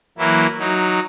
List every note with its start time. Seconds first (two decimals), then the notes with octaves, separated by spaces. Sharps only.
0.18 E3 F#3 A#3 E4
0.59 F#3 D#4